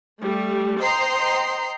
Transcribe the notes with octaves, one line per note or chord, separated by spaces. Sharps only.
G3 A3
C5 D#5 G5 A#5 C6 C7